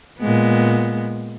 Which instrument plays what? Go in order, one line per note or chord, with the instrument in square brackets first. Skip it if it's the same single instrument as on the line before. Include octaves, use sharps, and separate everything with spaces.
[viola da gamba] A#2 G#3 B3